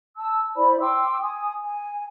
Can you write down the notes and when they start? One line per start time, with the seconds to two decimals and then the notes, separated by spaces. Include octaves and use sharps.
0.16 A5 E6
0.56 E4 C5 D5 B5
0.80 G5 C6 D6 E6
1.22 G#5 D#6
1.63 G#5